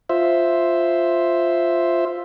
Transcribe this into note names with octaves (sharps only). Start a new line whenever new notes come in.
F4 C5 E5